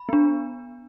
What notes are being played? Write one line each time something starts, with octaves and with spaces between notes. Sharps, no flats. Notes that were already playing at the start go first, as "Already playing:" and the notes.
Already playing: B5
B3 D4